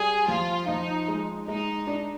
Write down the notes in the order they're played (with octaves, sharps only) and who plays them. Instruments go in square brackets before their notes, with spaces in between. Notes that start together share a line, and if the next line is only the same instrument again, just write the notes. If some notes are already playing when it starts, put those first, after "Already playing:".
Already playing: [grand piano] G3 [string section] G#4
[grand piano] F3 [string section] F4
[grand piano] F3 [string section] D#4
[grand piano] G#3
[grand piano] G#3 [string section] D#4
[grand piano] D4